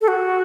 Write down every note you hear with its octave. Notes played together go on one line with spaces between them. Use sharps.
A4
F#4